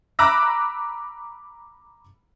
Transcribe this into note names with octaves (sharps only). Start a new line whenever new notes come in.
A#5 B5 D6 E6 F#6 A#6